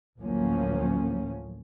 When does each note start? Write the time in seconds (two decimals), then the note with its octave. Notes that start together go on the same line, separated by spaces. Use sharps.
0.20 A1 D2 F3 F#3 A#3 C#4